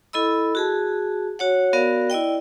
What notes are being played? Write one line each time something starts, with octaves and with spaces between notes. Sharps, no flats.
E4 A4 D#5 B5 E6
F#4 G#4 A5
F#4 C#5 F#5
B3 F#4 A#4 D5 F5
E4 D5 D#5 G5